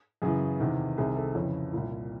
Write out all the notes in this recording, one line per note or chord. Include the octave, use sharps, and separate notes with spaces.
F#2 C#3 E3 G#4
E2 C3 D#3
C2 C3 D#3 G#4
A4
F2 C#3 E3 C#5
C2 A#2